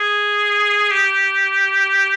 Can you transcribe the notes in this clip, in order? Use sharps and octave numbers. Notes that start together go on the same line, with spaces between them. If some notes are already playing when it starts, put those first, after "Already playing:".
Already playing: G#4
G4